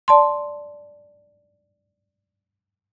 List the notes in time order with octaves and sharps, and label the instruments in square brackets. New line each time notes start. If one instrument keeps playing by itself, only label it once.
[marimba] D5 A5 C6